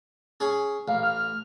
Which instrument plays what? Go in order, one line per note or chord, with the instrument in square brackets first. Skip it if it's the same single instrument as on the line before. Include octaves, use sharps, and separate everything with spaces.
[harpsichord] C#4 G#4
[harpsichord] A1 [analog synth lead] F5
[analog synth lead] F6